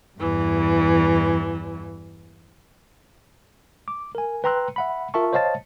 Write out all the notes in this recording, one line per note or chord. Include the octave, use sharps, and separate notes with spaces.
E2 G2 E3
D6
A#4 G#5
B4 G5 A#5 C6 E6 F#6
E5 F#5 B5
F4 A#4 E5 A5 C#6
C5 C#5 D#5 F5 A5 A6